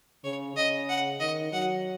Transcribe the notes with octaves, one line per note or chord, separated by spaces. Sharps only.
C#3 C#5
C#3 D#5
F#5
D#3 D#5
F#3 F#5